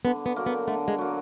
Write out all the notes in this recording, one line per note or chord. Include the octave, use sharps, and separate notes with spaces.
D3 B3
B3
F#3 A#3
B3
D3 A3
G#3
F#3 A#3